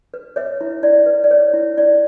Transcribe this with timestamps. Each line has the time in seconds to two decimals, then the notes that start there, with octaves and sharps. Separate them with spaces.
0.14 B4
0.36 B4 C#5 E5
0.61 E4
0.83 E4 D5
1.06 B4
1.24 D5
1.31 B4 C#5
1.53 E4
1.77 E4 D5